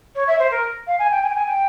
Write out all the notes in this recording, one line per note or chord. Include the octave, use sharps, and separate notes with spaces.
C#5
E5
C5
A#4
F5
G#5
G5
G#5
G5
G#5
G5